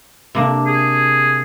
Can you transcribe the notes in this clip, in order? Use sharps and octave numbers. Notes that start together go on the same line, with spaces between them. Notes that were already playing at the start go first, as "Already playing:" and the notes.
C3 A#3 D4
G#4